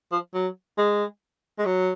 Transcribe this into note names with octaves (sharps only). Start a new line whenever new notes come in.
F3
F#3
G#3
G#3
F#3